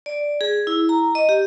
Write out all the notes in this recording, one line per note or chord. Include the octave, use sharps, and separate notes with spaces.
D5
G#4
E4
A#5
D#5
G4